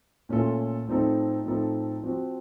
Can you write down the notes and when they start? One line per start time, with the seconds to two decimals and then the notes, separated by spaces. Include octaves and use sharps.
0.29 A#2 A3 C#4 F4 A4
0.87 A2 F3 C4 D#4 A4
1.45 A2 F3 C4 D#4 A4
2.03 F3 C4 F#4